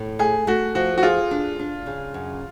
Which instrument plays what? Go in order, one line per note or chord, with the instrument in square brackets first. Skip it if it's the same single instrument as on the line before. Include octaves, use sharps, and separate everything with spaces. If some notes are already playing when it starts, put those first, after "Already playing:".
Already playing: [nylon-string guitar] A2
[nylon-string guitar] A3 [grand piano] G#4
[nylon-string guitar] A3 [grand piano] F#4
[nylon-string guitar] F3 [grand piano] F#4
[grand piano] F#4
[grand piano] F4 [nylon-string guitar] G#4
[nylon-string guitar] D4
D4
C#3
F#2